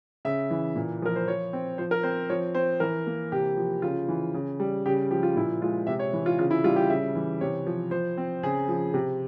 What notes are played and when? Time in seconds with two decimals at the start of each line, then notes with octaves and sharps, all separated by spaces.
0.25 C#3 E5
0.51 E3
0.76 A#2
1.02 F3 A#4
1.16 C5
1.28 F3 C#5
1.53 C4
1.78 F3 C5
1.91 A#4
2.03 C4 C5
2.30 F3 C#5
2.55 C4 C5
2.80 E3 A#4
3.07 A#3
3.32 C3 G4
3.57 F3
3.82 C#3 F4
4.08 E3
4.34 C#3
4.60 G3
4.86 C#3 G4
5.11 F3 G4
5.23 F4
5.36 A#2 E4
5.61 G#3 F4
5.87 C3 E5
5.99 C#5
6.13 E3
6.26 F4
6.38 C#3 F4
6.51 E4
6.64 G3 F4
6.76 G4
6.90 C#3 E5
7.15 E3
7.41 C3 C#5
7.66 F3
7.91 F3 C5
8.18 C4
8.43 C#3 G#4
8.68 F3
8.94 C3